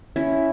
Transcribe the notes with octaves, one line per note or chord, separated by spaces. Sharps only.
C#4 E4